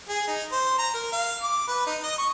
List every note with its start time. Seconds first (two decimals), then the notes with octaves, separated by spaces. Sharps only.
0.09 G#4
0.27 D#4
0.52 C5
0.78 A#5
0.94 A#4
1.12 F5
1.43 D6
1.68 B4
1.87 D#4
2.03 D#5
2.18 C#6